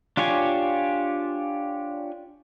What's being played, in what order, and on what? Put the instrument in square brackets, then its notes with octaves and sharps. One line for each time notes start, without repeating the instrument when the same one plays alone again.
[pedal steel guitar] D4 F4 G4 C#5 G#5